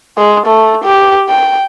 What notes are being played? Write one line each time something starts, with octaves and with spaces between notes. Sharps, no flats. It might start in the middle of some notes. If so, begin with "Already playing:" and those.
G#3
A3
G4
G5